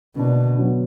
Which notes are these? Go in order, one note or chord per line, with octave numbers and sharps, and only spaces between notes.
B2 D3 A#3 D4
D3 F#3 B3